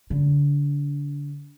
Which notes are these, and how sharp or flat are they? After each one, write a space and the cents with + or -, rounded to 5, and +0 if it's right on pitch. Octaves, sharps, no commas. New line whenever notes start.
D3 -35